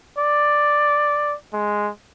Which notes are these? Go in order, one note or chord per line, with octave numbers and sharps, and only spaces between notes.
D5
G#3